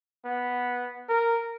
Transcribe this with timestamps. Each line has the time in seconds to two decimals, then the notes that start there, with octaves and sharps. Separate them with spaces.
0.25 B3
1.09 A#4